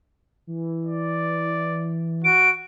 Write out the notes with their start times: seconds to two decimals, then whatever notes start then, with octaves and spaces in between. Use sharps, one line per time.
0.47 E3
0.85 D5
2.25 F#4 D7